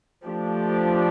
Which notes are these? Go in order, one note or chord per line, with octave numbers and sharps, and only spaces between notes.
F3 A3 D4 G4